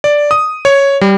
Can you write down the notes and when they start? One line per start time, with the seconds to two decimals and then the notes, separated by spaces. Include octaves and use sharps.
0.04 D5
0.31 D#6
0.65 C#5
1.01 G3